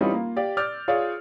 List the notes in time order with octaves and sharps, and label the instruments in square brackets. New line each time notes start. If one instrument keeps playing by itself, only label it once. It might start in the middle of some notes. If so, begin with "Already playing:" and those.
[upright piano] E3 G3 C4 C#4 D#4 F4
A#3 F4
G4 D5 F5
D5 D6 E6 F6 G6 A6
F4 G#4 C#5 D5 F5